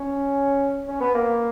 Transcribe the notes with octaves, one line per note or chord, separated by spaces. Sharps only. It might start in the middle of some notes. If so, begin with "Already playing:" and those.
Already playing: C#4
C#4
B3
A#3